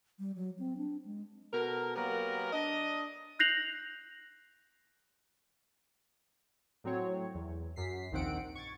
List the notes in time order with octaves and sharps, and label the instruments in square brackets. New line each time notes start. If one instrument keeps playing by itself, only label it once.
[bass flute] G3
F#3
C4
D4
G#3
[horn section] B2 A4 A#4
F#3 A#3 B3 G4 A#4
D4 D#5
[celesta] F#6 G6 A#6 C7 F7 F#7
[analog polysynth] A2 F#3 C4 C#5
E2
F#2 B6 C7
A#1 D#2 D#3 C4 F#5 D7
C#6 G#6 A6